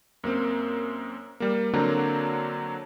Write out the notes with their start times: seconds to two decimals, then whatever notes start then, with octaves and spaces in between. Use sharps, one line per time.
0.24 F#2 A#3 C4
1.40 G3 A#3
1.73 D3 F#3 A#3 C4 D4 A#5